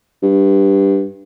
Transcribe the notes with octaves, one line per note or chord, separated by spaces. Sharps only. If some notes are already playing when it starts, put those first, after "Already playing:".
G2